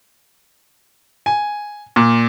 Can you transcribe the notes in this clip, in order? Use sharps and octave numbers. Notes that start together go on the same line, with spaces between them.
G#5
A#2